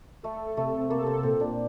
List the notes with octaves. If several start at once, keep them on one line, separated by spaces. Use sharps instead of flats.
A3 A4
C3 A3
A#3 A4
C4
A#2 C4
D4